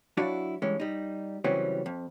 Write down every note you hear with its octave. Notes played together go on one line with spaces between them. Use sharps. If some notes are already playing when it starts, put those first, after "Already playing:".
F#3 D4 E4 F#4 D5 F5
G2 E3 G#3 C#4
G3 D#4
C#3 E3 F#3 G3 C4 C#4
F2